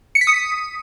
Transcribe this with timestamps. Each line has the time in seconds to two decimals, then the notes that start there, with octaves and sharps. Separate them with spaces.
0.15 C#7
0.21 B6
0.27 D#6